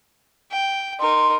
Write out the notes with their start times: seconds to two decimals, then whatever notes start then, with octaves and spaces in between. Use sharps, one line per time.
0.51 G5
1.01 D#4 A#4 C6